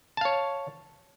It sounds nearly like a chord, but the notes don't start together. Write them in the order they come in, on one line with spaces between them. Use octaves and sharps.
A5 F5 C#5